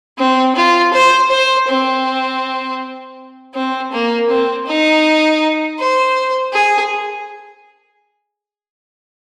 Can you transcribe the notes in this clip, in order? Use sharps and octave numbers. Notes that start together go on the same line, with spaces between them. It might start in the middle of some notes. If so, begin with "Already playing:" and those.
C4
F4
C5
C5
C4
C4
A#3
C4
D#4
C5
G#4